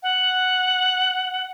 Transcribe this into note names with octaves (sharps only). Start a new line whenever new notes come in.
F#5